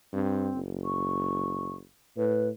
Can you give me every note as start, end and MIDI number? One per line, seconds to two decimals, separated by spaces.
0.13 0.49 43
0.13 0.59 60
0.54 1.81 30
0.84 1.74 85
2.17 2.50 45
2.17 2.47 71